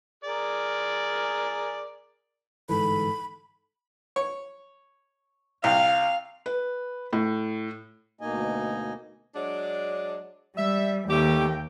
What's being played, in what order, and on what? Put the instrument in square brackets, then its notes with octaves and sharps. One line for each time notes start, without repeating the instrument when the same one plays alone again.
[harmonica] G#4 A#4 D5
[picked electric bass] G1 G#2 E3 [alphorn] A4 [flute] B5
[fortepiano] C#5
[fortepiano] C2 [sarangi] F5
[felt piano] B4
A2
[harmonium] D2 B2 A#3 D#4 D#5 G#5
[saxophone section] F#3 G#3 D4
[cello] G3 [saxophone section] E5
[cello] D#2 G5 [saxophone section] G3 A3 G4